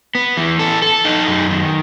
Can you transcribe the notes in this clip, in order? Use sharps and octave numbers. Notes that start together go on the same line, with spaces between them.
B3
E3
A4
A4
D#4
F#2
D#3